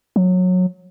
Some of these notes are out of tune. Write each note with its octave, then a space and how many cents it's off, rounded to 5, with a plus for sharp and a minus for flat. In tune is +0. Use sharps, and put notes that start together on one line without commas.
F#3 -20